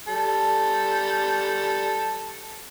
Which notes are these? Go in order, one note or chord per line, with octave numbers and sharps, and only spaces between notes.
G3 A4